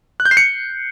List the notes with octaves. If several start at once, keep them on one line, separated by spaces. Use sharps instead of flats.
F#6
G6
C7
C#7